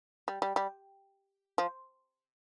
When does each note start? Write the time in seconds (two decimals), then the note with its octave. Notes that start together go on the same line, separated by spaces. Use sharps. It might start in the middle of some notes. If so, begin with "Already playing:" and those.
0.28 G3
0.42 G3
0.56 G3
1.58 F3